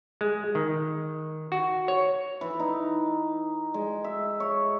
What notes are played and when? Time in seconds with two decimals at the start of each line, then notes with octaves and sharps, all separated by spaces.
0.21 G#3
0.55 D#3
1.52 F#4
1.88 C#5
2.41 E3
2.60 D#4
3.74 G#3
4.04 E5
4.40 C#5